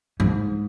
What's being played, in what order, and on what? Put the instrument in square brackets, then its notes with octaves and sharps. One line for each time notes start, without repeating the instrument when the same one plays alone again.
[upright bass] G#2